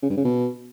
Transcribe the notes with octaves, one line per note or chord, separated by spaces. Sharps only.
C#3
G2
C#3
B2